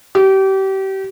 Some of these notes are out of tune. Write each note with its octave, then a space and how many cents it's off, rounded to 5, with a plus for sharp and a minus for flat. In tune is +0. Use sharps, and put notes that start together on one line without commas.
G4 -30